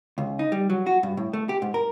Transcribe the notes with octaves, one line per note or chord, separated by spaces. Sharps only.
C#2
D#4
G3
F#3
F#4
G2
A2
A3
G4
G#2
A#4